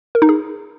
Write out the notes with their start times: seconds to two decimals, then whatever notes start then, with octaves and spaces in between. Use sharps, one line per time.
0.15 A#4
0.22 D#4
0.29 G#4